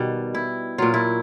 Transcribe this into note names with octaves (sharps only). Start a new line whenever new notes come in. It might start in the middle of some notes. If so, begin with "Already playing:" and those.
Already playing: B2 D#3 G3
E4
A#2 F#3 F4
E4